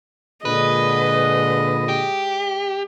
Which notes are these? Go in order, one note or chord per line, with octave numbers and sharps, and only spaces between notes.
A#2 D3 G#3 B4 D#5
G4